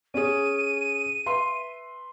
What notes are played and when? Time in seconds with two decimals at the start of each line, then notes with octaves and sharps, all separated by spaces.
0.14 C#4 G#4 D#7
1.26 B4 E5 C6